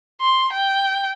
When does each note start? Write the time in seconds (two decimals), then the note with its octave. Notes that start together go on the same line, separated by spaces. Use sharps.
0.21 C6
0.53 G5